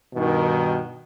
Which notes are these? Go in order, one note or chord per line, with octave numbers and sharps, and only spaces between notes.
G2 B2 D#3